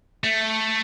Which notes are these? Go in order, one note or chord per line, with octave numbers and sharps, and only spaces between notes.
A3